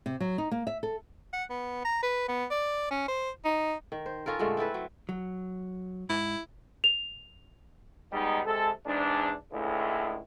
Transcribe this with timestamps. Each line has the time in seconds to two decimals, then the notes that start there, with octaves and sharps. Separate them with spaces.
0.06 C3
0.20 F#3
0.38 D#4
0.51 A#3
0.67 E5
0.83 A4
1.33 F#5
1.50 B3
1.85 A#5
2.03 B4
2.28 B3
2.51 D5
2.91 C#4
3.08 C5
3.45 D#4
3.92 D#3
4.06 C5
4.26 C#4 F4 A4 A#4
4.39 A#2 D3 G#3 A3
4.57 C4 E4 A4 B4
4.74 F#3
5.09 F#3
6.09 G#2 E4
6.84 F7
8.12 G3 G#3 B3 D#4
8.45 C3 G#3 A4
8.86 E2 G#2 D4
9.52 C#2 A2 D3 G#3 E4